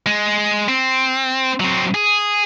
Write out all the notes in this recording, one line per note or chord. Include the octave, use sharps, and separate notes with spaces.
G#3
C4
F#3 C4
G#4